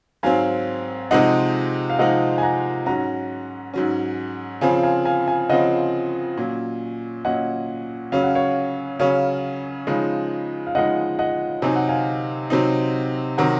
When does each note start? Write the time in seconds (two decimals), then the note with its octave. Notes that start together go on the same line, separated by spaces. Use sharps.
0.23 G#2 F#3 C4 F5 G#5
1.11 C3 F3 G#3 C4 D#4 D#5 F#5
1.90 F5
1.99 C3 F3 G#3 C4 D#4 D#5 F#5
2.38 G#5
2.42 F#5 A#5
2.86 G#2 F#3 C#4 F#5 A#5
3.74 G#2 F#3 C#4
4.61 C#3 F3 C4 F5 G#5
4.83 F5 G#5
5.05 F5 G#5
5.28 F5 G#5
5.49 C#3 F3 C4 D#5 F#5
6.37 A#2 F#3 C#4
7.25 A#2 F#3 C#4 D#5 F#5
8.12 C#3 F#3 C#4 F5
8.23 F#5
8.35 C#5 F5
8.99 C#3 F#3 C#4 C#5 F5
9.87 C#3 F3 G#3 D#4
10.67 F5
10.75 C#3 F3 G#3 D#4 D#5 F#5
11.19 D#5 F#5
11.62 C3 F#3 C4 D#4 G#5
11.76 F#5
11.89 F5 G#5
12.50 C3 F#3 C4 D#4
13.38 C3 D#3 F#3 F#5 A#5